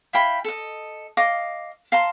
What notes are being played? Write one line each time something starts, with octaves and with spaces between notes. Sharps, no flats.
E4 F5 G5 B5
A4 D#5
D#5 F5 D6
F5 A5 A#5 C6